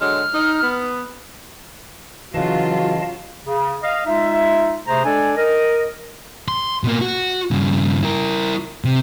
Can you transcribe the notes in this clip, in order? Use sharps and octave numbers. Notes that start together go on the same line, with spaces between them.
D3 F#3 G#3 F6
D#4
B3
C#3 E3 F#3 F4 F#4 D#5 F5 A5
C#3
D#5 F5
G#3 D#4 F4 E5
C3 A3 G#4 C5 A#5
G#3 D4 A4 D5 G#5
A#4 D#5
C6
B2 A#3
F#4
G2 C#3
E4 A#4
C3